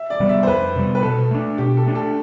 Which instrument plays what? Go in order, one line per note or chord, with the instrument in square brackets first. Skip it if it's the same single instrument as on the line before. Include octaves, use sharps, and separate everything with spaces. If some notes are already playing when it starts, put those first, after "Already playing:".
Already playing: [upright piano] E5
D5
[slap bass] C3 G3 B3
[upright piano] E5
C5
[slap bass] F2 [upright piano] B4
[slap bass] C3 G3 B3
[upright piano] B4
[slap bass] B2 [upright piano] A4
[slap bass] A3 D4
[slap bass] B2 [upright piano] G4
[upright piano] A4
[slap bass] A3 D4
[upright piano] A4